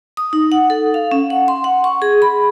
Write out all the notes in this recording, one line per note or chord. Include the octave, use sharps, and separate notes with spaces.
D#6
D#4
F#5
A4
F5
C#4
F#5
C6
F#5
C#6
G#4
B5